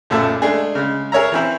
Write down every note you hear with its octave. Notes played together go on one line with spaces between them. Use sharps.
B1 F#2 A#2 A3 E5 A5
G#3 A3 D4 G#4
C#3 G#3
G#4 A#4 C#5 E5 A#5
E3 C4 E4